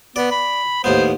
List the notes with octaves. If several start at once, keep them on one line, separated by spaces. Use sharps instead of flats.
B3 D5
B5
D#2 A2 B3 C5